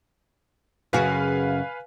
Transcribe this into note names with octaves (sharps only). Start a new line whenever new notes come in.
F#2 C#3 F#4 B4 F5 G#5